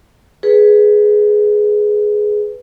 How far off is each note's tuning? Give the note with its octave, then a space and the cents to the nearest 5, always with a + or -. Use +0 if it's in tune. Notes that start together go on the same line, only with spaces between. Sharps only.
G#4 +10 B4 +0